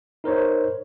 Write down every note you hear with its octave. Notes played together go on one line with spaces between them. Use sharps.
D#4 A#4 C5 C#5